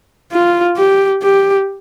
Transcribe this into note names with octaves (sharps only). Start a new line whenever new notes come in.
F4
G4
G4